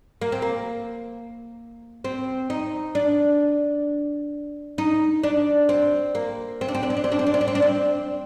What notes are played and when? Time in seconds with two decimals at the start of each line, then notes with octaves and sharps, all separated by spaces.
0.21 A#3
0.32 C4
0.42 A#3
2.04 C4
2.50 D#4
2.95 D4
4.78 D#4
5.23 D4
5.69 C4
6.15 A#3
6.61 C4
6.68 D4
6.75 C4
6.83 D4
6.90 C4
6.97 D4
7.04 C4
7.12 D4
7.19 C4
7.27 D4
7.34 C4
7.41 D4
7.48 C4
7.55 D4
7.62 C4